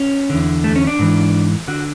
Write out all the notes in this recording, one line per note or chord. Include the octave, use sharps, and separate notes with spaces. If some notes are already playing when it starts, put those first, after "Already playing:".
Already playing: C#4
E2 D3
A3
C#4
D4
G#2 E3
D3 F#4